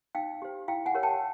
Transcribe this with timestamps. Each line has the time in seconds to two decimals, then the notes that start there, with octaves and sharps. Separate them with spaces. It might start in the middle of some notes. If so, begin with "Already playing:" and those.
0.15 D#4 F5 G5
0.42 G4 C5
0.68 E4 F5 G5
0.86 F#5 G#5
0.94 G4 A#4 C#5
1.03 G5 A5